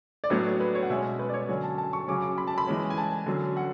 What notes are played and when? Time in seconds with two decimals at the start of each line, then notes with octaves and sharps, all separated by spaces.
0.24 D5
0.30 A2 F#3 B3 D4 C#5
0.60 B4
0.75 C#5
0.83 F#5
0.90 B2 G#3 C#4 E5
1.19 B4
1.29 D5
1.34 C#5
1.49 D3 F#3 C#4
1.64 A5
1.78 A5
1.93 C#6
2.08 C#3 F#3 C#4 D6
2.22 D6
2.38 B5
2.47 A5
2.58 B5
2.67 E3 G#3 C#4
2.90 G#5
2.98 A5
3.26 D3 F#3 C#4
3.57 F#5